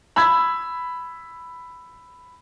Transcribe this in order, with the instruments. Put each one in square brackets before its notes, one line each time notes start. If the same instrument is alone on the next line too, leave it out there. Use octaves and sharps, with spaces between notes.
[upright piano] B5 E6 G#6